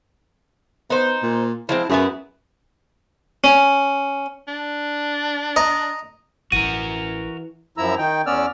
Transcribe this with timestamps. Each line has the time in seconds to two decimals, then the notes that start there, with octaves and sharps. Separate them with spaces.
0.90 B3 D#4 C5
1.23 A#2
1.69 F3 G#3 C4 E4
1.90 F#2 B3 E4 G#4
3.44 C#4
4.48 D4
5.56 D#5 A#5
6.52 A1 E3 C#4 F#4 A#4 D#7
7.78 F#2 F3 E4 A#5 E6
7.98 D#3 D#4 G5
8.26 E2 B3 C#4 D5 E6 F6